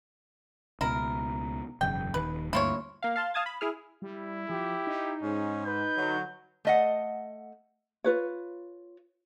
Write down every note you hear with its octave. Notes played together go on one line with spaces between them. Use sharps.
C#2 B2 E4 A#4
E1 F#2 C#3 G5
D#1 D#3 B4
D2 G2 A#3 E4 F4 C#5
A#3 F5
F5 A5 C6
F5 A5 D#6 G#6 A6
B5
E4 G#4 F6
G3 E4
F3 G4
D#4
G#2 C#4
B4 G6
D3 F#3
A3 D#5 F#5
F4 B4 C#5